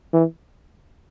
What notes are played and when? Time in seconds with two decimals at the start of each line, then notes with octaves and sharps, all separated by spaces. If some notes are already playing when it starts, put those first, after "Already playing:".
0.13 E3